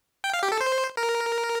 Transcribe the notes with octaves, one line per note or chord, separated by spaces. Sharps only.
G5
F5
G4
A4
C5
A#4